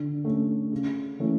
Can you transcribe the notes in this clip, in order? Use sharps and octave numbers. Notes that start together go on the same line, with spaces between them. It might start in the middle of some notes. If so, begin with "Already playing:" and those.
Already playing: D3
A3 C#4
C#3
E3 A3 C#4